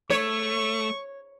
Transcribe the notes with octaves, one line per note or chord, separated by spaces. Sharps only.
A3 C#5 C#6